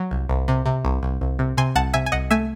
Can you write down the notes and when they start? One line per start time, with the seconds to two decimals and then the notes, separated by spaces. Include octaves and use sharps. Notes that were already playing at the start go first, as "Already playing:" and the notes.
Already playing: F#3
0.11 C2
0.29 C2
0.48 C3
0.66 C3
0.85 C2
1.03 C2
1.21 C2
1.39 C3
1.57 C3 G#5 C6
1.75 C2 F#5 A5
1.94 C3 E5 G#5
2.06 G#5
2.12 C2 D#5 F#5
2.31 A3 E5 G#5